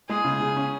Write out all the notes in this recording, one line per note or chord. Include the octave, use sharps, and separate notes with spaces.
G#3 G#4
C#3
C#3
C#4